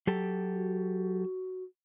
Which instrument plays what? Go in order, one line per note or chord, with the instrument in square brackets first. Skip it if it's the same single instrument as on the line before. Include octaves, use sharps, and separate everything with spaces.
[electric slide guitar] F#3 G4 A4
[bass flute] F#4